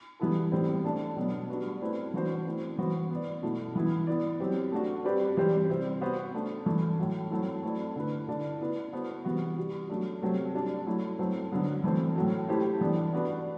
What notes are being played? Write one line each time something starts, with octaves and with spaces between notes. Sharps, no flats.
E3 G3 B3 E4 A4
A2 E3 G3 C4
A3 D4 A4 D5
B2 F#3 B3 D4
G3 D4 F#4 B4
A3 C4 E4 B4 D5
E3 B3 D4 F#4 C5
A3 C4 E4
E3 B3 F#4 C5
B3 F#4 B4 D5
B2 A3 E4
E3 B3 E4
B3 E4 B4 D5
F#3 C4 G4
A3 D4 F#4
G3 C4 G4 B4 D5
E3 G3 C4 G4 C5
C3 G3 C4
B3 F#4 C5
A3 D4 A4
E3 A3 E4
A2 F#3 A3
F#3 A3 C4 E4
A3 C4 E4 A4 D5
D3 A3 E4 B4
D3 A3 E4 A4 D5
B3 E4 B4 D5
B3 F#4 A4 C5
C3 E3 B3 F#4
G3 B3 F#4
F#3 A3 D4
C3 F#3 A3 C4
G3 D4 A4 D5
F#3 A3 E4
F#3 A3 C4
D3 F#3 B3
E3 A3 C4
A2 F#3 A3
A3 E4 G4 C5
E3 B3 D4 A4 D5
B3 D4 F#4 B4 D5